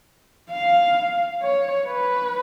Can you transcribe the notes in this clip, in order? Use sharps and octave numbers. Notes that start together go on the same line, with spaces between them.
F5
C#5
B4